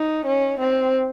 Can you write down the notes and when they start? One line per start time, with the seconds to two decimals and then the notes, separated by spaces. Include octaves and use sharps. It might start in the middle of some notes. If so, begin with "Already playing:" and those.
Already playing: D#4
0.26 C#4
0.60 C4